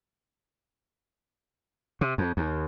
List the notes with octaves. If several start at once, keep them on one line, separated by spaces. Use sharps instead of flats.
C3
F2
D#2